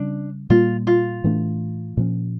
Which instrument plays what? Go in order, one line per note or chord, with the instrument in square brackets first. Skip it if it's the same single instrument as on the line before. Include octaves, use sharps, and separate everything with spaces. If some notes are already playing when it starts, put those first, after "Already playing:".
Already playing: [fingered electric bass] C#3 G3 C#4 [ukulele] D4
[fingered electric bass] A#2 G3 A#3 [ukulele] F4
[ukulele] F4
[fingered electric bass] A2 E3 A3 D4
A#2 F3 C#4